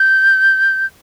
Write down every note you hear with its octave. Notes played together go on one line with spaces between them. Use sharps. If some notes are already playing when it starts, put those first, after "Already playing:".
Already playing: G6